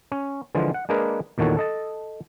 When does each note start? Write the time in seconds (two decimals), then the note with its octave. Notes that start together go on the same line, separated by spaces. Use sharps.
0.12 C#4
0.55 D3 E3 F3 G#3 F4
0.74 F#5
0.89 G#3 A#3 D4 G#4 A#4 B4
1.38 E2 A#2 D#3 F#4 A4 C#5
1.57 A4 D#5 A5